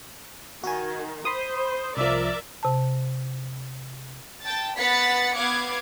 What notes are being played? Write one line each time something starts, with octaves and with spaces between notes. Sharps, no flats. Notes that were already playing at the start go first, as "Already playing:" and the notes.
D#3 F#4 G#5
C5 B5 C6 D#6
C2 F3 A#4 D5 E5
C3 A5
G5 A5 A6
B3 F#5 B5 A6 B6 C#7
B3 F5 F#5 D6 G#6